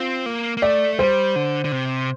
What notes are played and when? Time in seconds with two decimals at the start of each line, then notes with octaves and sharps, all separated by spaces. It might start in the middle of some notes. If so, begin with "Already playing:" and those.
Already playing: C4 F4
0.26 A#3
0.57 A#3
0.62 A3 D5
0.99 G3 C5
1.36 D3
1.64 D3
1.72 C3